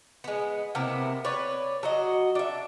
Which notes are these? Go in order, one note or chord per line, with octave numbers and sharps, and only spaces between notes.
G#3 B3
C3 A#3 B3 E4
B4 C#5 D5
F#3 F#4 D#5
D4 E5